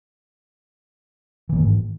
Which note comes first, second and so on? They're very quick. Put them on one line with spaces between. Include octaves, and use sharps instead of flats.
E3 A#3 D#3 G#2